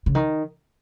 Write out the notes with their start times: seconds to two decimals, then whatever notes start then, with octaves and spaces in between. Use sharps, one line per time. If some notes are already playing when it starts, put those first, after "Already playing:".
0.06 C#3
0.15 D#3